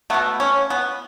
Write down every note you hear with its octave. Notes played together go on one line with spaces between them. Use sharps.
B2 A3 B3
C#4
B3